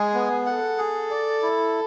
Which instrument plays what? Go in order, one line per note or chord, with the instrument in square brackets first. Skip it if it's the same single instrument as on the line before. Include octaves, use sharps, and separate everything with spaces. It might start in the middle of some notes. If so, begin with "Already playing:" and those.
Already playing: [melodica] G#3 [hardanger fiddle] G#4
[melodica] B3
[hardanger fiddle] A4 [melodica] F#5
[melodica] G#4
D5
E4